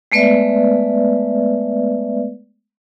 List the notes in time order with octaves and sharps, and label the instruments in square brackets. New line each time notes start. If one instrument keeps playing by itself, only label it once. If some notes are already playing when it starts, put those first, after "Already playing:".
[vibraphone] G#3 A3 B3 B4 D5 E5